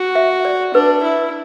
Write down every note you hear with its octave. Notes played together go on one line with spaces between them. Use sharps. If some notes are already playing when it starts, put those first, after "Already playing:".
Already playing: F#4
E5
D5
D4 B4
E4